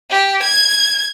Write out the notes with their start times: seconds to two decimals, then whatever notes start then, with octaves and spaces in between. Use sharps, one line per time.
0.10 G4
0.43 G#6